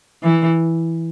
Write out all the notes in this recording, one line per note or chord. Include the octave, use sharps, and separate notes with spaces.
E3